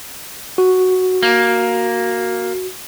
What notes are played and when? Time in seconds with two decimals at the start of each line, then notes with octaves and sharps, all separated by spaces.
0.58 F#4
1.23 A#3